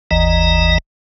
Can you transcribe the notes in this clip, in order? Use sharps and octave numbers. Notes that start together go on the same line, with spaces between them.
G1 D#2 E3 D#5 A#5